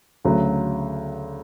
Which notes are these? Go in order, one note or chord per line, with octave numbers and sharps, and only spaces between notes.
D2 C#3 F#3